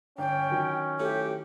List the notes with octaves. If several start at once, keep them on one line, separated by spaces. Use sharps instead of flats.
G1 C#4 G5
D#3 F#3
A2 G4